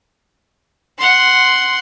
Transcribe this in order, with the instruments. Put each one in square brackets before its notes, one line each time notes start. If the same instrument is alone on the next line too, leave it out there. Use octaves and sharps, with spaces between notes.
[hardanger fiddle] F#5 C6